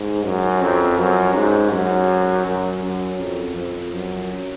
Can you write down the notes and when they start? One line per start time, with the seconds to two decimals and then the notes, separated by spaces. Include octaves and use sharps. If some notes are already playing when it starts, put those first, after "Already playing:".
Already playing: G#2
0.25 F#2
0.62 F2
0.99 F#2
1.35 G#2
1.72 F#2
2.46 F#2
2.83 F#2
3.20 F2
3.56 F2
3.93 F#2